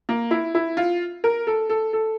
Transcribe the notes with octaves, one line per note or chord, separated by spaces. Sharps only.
A#3
E4
E4
F4
A#4
A4
A4
A4